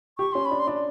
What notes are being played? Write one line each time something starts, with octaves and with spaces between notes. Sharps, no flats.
G4 C#6
C#4 C6
B5
D4
C6
D4